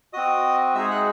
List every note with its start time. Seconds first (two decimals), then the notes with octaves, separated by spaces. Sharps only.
0.13 C4 F#4 D#5 D#6
0.75 G#3 D#4 G#4 E5 E6
0.91 F#5 F#6